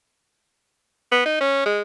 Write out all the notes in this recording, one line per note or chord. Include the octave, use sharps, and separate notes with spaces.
B3
D#4
C#4
G#3